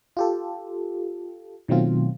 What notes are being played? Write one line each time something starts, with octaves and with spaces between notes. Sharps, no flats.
F4 G4 A4
B2 D#3 F#3 A3 C4 F4